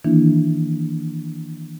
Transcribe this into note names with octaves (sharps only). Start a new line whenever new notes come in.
D#3 E3 A#3 D4 E4